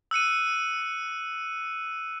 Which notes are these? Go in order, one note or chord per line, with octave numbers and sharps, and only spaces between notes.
E6 F#6 C#7 D#7